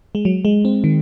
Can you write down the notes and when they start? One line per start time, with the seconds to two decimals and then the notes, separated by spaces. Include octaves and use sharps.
0.15 G#3
0.25 F#3
0.45 G#3
0.65 C4
0.84 D#3